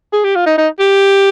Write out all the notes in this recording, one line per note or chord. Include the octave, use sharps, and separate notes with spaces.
G#4
G4
F4
D#4
D#4
G4